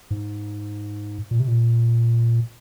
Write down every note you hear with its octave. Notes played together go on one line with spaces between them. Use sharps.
G#2
A#2
C3
A#2